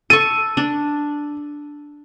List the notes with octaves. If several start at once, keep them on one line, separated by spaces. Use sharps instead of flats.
A4 C#6 D#7
D4